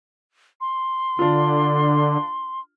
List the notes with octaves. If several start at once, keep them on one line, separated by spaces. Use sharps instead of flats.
C6
D3 D4 F4